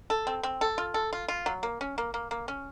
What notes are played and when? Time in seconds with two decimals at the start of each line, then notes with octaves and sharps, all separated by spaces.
0.10 A4
0.27 C4
0.43 C4
0.61 A4
0.78 F4
0.94 A4
1.13 F4
1.28 F4
1.46 F#3
1.63 A#3
1.81 C#4
1.98 A#3
2.14 A#3
2.31 A#3
2.48 C#4